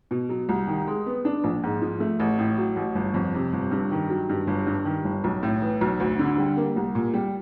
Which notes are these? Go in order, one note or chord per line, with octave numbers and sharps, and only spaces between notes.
B2
F#3
C2
D#3
G#3
B3
D4
A#1
G#2
F3
A3
A1
A2
F#3
A1
G1
F2
C3
G1
G2
D#3
F#3
G2
G1
G2
D#3
G1
B1
A2
E3
B1
D2
D3
G3
A#3
C2
A#2
G3